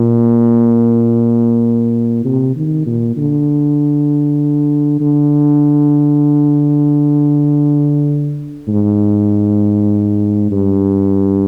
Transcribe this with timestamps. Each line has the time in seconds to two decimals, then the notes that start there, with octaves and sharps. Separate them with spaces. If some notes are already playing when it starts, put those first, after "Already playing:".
Already playing: A#2
2.25 C3
2.56 D#3
2.86 A#2
3.17 D3
5.01 D3
8.68 G#2
10.51 G2